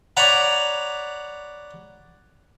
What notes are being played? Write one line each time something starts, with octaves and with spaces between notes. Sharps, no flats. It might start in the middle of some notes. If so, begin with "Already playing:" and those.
C#5 D5 F#5 A#5 B5